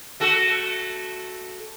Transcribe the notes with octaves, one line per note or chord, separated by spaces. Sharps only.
A3 F#4 A4